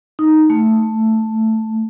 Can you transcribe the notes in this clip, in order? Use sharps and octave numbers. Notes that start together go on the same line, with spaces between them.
D#4
A3